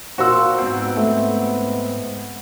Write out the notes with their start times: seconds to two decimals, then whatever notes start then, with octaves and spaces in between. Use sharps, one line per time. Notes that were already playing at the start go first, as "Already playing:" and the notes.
0.18 A#2 F#4 C5 F5 C6 E6
0.58 G#2 B3 C4 F#5
0.96 A3